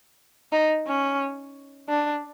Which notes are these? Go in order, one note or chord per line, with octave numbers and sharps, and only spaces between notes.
D#4
C#4
D4